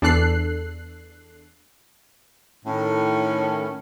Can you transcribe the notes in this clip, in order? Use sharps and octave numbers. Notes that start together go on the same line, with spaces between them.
E2 D4 A4 F#6 C7
A2 D#3 C#4